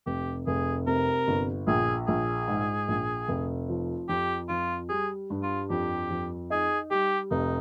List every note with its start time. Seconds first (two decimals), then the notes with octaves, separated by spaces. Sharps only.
0.06 F1 G4
0.47 F1 G#4
0.87 C3 A#4
1.27 G1
1.67 A#1 G#4
2.08 A#1 G#4
2.48 G#2
2.88 A#1
3.28 F1
3.69 F3
4.09 F2 G4
4.49 F2 F4
4.89 G3 G#4
5.30 G2
5.43 F4
5.70 F2 G4
6.10 F2
6.50 D#4 G#4
6.91 G3 G4
7.31 F1 D#4